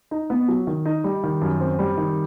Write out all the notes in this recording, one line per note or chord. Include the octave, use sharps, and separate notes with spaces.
D#4
B3
F#3
D#3
D#4
G3
D#3
F#2
C4
G3
D#3